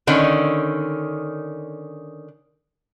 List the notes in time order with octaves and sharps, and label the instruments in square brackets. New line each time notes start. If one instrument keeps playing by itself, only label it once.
[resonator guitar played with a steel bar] D3 D#3 C#4